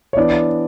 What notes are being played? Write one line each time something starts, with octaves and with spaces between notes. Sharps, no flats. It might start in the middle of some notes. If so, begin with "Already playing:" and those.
C#5
E3 B3 D4 D5